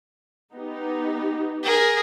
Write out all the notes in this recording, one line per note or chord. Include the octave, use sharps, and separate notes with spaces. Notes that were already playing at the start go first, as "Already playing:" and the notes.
B3 D#4 G4
G#4 A#4